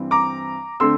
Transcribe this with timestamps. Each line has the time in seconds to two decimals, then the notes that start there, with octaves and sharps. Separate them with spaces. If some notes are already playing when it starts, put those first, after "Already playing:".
Already playing: G2 E3 G3 C4
0.11 A#5 D6
0.80 D3 A3 C4 C6 E6